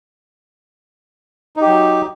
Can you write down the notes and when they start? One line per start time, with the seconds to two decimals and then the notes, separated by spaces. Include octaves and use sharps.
1.57 D#4
1.62 G4
1.66 F#3